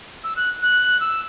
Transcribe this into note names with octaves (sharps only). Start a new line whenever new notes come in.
E6
F#6
F#6
E6